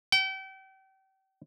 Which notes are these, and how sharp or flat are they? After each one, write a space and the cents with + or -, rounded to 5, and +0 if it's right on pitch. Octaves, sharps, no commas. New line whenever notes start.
G5 -35